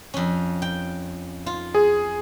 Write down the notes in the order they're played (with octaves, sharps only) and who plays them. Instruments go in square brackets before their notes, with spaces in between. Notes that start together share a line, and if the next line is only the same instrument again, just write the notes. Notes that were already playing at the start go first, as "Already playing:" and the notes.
[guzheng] F2 C#4
G5
F4
[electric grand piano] G#4